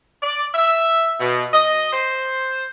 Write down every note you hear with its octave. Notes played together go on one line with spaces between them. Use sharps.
D5
E5
B2
D#5
C5